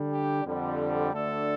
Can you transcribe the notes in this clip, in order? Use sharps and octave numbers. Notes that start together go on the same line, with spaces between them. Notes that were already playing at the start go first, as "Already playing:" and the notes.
Already playing: D3 G3 D4
G4
F2 D3 G3
D2 D3 A3 D4 A4